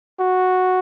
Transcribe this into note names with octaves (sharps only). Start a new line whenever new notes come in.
F#4